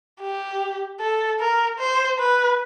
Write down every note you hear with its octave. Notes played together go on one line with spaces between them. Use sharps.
G4
A4
A#4
C5
B4